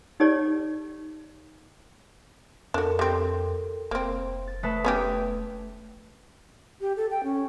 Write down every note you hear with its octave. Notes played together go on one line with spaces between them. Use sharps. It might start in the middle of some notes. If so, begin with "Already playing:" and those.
D#4 G4 A4 C#5 D5
F2 D4 F#4 A4 A#4
G3 C4
F1 A#3 C4 C5
A6
A3 B4 A5 D#6 F#6 B6
B3 C#4 G4
G4
A4
G5
C#4